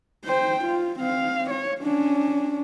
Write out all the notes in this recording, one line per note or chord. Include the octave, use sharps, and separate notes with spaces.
C5 G5
F4
C4 F5
C#5
C#4 D4